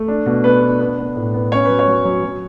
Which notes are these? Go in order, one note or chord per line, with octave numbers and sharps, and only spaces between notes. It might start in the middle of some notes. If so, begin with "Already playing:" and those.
Already playing: A3
D4
B2
B3 B4
D4
B3
B3
A2
B3
C#4 C#5
F#3 B4
C#5
F#3
F#3
F#3